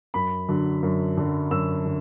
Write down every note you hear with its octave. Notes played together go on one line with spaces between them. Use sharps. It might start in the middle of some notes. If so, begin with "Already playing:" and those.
F#2 B5
D3 F#3
F#2
D3 F#3
F#2 E6
D3